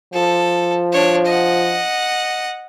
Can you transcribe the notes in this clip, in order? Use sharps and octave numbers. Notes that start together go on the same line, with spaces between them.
F3 A4
D4 C#5
D#5 F#5